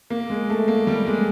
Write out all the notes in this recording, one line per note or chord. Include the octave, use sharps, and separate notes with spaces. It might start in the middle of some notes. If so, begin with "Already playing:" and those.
A#3
G#3
A3
A#3
G3
G#3